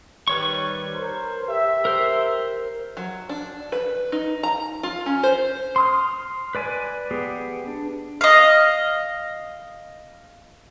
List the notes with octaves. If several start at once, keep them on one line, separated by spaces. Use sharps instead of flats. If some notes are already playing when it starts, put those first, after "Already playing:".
D#3 G3 B4 C#5 C#6
A#4 C5
G4 E5
A#4 C5
F#3
D4
B4
D#4
A#5
F4
C#4
C5
C6 D#6 F6
B4 D5 G#5
B3 G4 G#4
D4
D#5 F5